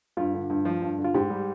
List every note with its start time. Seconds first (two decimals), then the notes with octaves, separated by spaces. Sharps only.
0.17 G2 F4
0.33 D3
0.50 G2
0.65 F3
0.81 G2
0.98 D3
1.05 F4
1.14 G#2 G4
1.30 G3